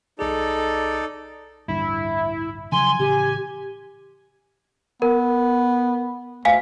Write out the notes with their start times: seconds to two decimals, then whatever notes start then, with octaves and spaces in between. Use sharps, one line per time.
0.19 B1 D#4 G#4 A4 D5
1.68 A1 D2 G2 E4
2.72 C#3 F3 F#3 G#5 C6
2.99 A1 C#3 G4
5.02 B3 A#4
6.45 D2 F5 G#5 B6